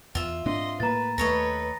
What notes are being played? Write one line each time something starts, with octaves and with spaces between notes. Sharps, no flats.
E2 F4 E5
G#2 C4 D4 D#5 C6
A2 A#3 B4 A#5 A6
D#2 A3 A4 B4 C#5 D#5 A#6